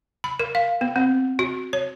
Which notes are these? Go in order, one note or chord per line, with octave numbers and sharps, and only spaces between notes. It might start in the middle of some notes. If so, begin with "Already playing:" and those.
B5
A#4
F5
B3
C4
F#4
C#5